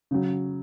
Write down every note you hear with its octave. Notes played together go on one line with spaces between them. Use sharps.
C#3 F#3